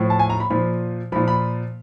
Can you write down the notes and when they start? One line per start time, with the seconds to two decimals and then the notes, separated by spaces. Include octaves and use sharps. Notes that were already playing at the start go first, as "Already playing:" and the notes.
Already playing: A2 F3
0.10 A5
0.19 G#5
0.30 A#5
0.40 B5
0.50 A#2 F3 B5
1.12 F3 B5
1.16 A#2
1.28 B5